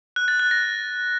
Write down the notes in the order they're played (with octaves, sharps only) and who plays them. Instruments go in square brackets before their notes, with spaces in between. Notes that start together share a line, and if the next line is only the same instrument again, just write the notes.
[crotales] F#6
A6
F#6
A#6